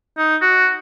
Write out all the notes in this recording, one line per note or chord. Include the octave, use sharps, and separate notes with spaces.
D#4
F#4